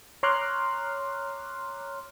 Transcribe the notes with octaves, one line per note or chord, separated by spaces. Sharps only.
C#5 A#5 C6 D6 F6 F#6